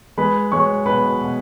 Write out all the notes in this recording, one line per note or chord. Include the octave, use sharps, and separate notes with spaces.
G#3 B4 B5
G#3 C#5 C#6
B2 B4 B5
B2